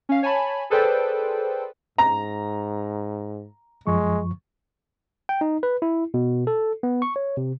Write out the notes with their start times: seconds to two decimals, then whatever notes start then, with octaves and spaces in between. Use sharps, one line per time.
0.09 C#4 F5
0.23 C#5 G#5 A5 B5
0.70 G#4 A4 B4 C5 D5 G5
1.98 G#2 A#5
3.87 F#2 F3 G#3 C#6
5.29 G5
5.41 D#4
5.63 B4
5.82 E4
6.14 B2
6.47 A4
6.83 B3
7.02 C#6
7.16 C#5
7.37 C3